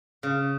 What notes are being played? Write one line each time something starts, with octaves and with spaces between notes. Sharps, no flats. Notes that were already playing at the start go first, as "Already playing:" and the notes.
C#3